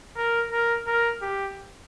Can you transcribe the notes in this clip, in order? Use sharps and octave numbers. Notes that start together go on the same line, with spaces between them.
A#4
A#4
A#4
G4